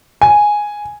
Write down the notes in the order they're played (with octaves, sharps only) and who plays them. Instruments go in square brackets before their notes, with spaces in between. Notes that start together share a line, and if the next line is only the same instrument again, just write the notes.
[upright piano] G#5